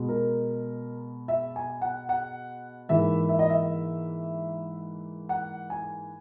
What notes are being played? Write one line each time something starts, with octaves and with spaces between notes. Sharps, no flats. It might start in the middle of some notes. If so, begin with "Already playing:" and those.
Already playing: B2 G#3
A#4
E5
G#5
F#5
F#5
G#2 E3 A#3 E5
E5
D#5
E5
F#5
G#5